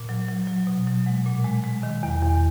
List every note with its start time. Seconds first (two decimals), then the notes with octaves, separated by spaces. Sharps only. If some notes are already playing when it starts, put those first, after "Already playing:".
Already playing: A#2
0.09 F#3
0.28 F#3
0.48 F#3
0.67 B2
0.87 F#3
1.06 G#3 F#5
1.26 A#2
1.45 G#3
1.64 G#3
1.83 D#3
2.03 E2
2.22 E2